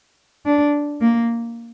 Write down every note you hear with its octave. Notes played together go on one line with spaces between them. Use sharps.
D4
A#3